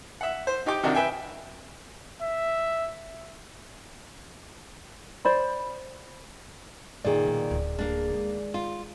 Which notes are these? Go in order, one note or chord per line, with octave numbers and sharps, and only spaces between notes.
E5 F#5
C5
D#4 G4 G5 D6
C3 D#3 D4 F#4 A#4
B4 E5 G5 G#5
E5
C5 D5 B5
A#2 D3 D#3 G#4 D5
B2 F#3
D1 D2
A#3 D4
D#3 G#3
F4